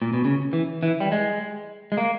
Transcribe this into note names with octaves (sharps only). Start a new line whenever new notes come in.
A#2
B2
C#3
E3
E3
G3
G#3
G#3
A#3